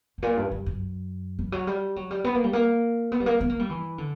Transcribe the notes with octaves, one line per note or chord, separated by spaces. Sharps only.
G2
A#2
G2
G2
F#2
E3
F#3
G3
F#3
G3
B3
A#3
G3
A#3
B3
G3
A#3
B3
A#3
G3
E3
D3